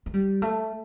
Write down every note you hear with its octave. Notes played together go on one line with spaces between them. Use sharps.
A3
G3
A3